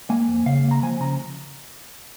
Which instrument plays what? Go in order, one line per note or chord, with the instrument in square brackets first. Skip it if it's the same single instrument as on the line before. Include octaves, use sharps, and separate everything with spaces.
[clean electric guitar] A#3 G#5
F2
C#3 F5
A#3
A#5
F3 G#5
C#3 A#5